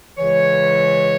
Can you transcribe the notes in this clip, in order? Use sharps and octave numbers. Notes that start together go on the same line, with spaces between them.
C#2 C#3 E3 C#5